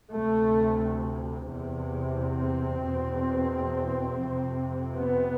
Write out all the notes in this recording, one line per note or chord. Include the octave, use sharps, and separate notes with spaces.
D2 C3 A3
E2 C3
C4
E2 B2
F2 C3
B3